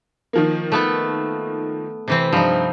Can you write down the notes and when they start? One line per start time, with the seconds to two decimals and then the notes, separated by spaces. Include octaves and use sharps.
0.33 D#3 F3 A#3
0.72 A3 B3 A4
2.08 C3 E3 C4
2.32 G2 F3 D#4